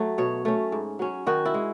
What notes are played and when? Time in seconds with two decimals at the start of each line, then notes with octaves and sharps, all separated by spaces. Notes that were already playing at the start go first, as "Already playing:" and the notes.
Already playing: F#3 A3
0.18 B2 C#5
0.45 A3 C#4
0.72 G#2
0.99 F#3 C#4
1.27 D#3 F#4
1.45 E4
1.54 G#3